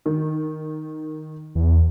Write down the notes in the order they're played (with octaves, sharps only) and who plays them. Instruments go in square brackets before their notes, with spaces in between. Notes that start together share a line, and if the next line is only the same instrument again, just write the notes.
[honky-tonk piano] D#3
[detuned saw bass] E2